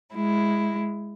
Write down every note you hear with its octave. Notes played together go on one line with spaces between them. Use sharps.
G#3 E4